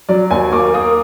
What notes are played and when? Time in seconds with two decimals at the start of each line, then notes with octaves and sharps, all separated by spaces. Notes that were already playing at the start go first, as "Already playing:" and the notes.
0.09 F#3 D5
0.31 D#2 G#5
0.53 A#3 D6
0.74 A#3 D#6